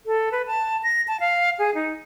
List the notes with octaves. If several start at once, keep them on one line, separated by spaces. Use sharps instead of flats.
A4
B4
A5
A#6
A5
F5
G#4
D#4